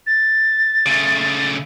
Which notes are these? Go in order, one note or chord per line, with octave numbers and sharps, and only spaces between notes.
A6
C#3 A3